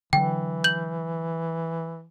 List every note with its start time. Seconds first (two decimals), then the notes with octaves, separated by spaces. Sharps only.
0.13 D3 E3 F#3 G5
0.64 G6 F#7